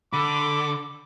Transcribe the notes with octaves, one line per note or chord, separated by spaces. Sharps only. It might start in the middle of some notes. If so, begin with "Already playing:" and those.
D3 B5 D6